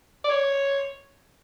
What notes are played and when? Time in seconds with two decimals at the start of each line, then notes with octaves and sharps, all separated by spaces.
0.24 D5
0.30 C#5